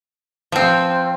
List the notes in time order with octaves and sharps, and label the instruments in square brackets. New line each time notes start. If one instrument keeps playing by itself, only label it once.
[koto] F3 C4